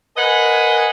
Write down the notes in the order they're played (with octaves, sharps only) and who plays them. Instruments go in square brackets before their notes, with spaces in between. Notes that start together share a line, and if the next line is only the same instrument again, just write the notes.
[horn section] A#4 B4 D#5 F#5 G#5